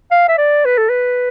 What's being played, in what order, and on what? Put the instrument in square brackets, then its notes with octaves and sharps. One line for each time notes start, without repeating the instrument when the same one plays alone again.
[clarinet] F5
E5
D5
B4
A4
B4